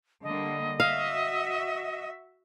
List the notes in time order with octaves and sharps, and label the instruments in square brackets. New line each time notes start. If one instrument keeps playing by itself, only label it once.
[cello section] D3 G3 A#3 [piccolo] D#5
[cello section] F#4 E5 [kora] F5